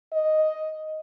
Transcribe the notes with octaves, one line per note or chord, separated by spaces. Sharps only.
D#5